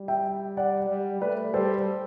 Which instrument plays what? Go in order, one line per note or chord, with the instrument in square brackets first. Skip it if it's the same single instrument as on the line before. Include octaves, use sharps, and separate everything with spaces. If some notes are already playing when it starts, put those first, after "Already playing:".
Already playing: [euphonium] G3
[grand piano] E5 G5
D5 F#5
[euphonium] G3
[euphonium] A3 [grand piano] B4 D5
[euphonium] G3 [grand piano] A4 C5